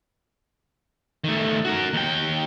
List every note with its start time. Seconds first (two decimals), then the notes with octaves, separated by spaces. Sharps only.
1.24 D#3 A3
1.65 F#4 A#4
1.93 D#2 G5